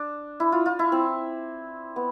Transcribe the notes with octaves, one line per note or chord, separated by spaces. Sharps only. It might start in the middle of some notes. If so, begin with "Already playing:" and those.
Already playing: D4
E4
F4
F4
E4
C4
B3